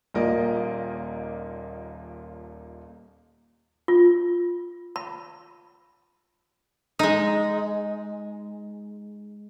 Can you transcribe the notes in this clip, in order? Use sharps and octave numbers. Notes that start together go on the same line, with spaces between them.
D#1 D#2 A#2 A#4 D5 D#5
F4
B5
G#3 D#4